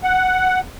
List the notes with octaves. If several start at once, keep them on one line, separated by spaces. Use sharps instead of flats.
F#5